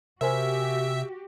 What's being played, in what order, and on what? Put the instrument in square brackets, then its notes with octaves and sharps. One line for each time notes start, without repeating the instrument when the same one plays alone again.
[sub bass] C3 [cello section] F#4 G4 [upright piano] A#4 C5 G#5 [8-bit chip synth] E5